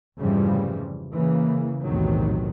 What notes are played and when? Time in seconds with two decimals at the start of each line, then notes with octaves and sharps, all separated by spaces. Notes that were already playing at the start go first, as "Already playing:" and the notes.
0.18 F1 G#2 C#3 E3 F3 G3
1.14 C#3 E3 A#3
1.85 B1 E2 A2 C3 D#3 F#3